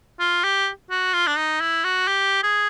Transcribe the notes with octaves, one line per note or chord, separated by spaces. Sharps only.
F4
G4
F#4
F4
D4
D#4
E4
F#4
G4
G#4